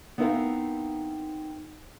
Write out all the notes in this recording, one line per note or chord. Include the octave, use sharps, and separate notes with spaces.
B3 C4 D#4 E4 A#4 F5